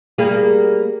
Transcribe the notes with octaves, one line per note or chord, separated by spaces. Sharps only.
G3 A#3 G#4